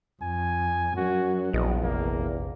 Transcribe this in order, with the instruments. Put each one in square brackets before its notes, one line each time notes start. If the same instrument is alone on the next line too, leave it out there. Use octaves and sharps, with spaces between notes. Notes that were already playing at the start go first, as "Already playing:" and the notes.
[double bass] F2 [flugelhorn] G#5
[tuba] F#2 [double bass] F#3 [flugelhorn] F#4
[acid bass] A#1 [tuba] E2 [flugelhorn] D#5
[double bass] F1 [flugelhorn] A#3